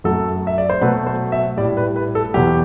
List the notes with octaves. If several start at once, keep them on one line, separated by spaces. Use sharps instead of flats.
F#2 F#3 A3 A4
E5
D5
C5
B2 F#3 A3 B4
C5
E5
A2 G3 D5
B4
B4
A4
E2 B2 F#3 G4